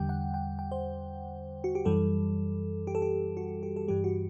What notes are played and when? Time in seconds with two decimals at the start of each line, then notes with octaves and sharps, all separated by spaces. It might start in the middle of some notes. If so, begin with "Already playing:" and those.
Already playing: E2 D3 G3 G5
0.09 F#5
0.34 G5
0.59 G5
0.71 C5
1.64 F#4
1.75 G4
1.85 F#2 E3 G3 A4
2.87 G4
2.95 A4
3.02 G4
3.37 F#4
3.63 G4
3.76 A4
3.88 G2 E3 G3 G4
4.04 F#4